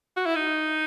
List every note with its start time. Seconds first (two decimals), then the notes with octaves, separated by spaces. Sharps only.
0.16 F#4
0.26 E4
0.36 D#4